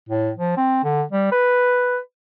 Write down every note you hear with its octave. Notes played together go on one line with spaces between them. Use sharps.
A2
F3
C4
D3
G3
B4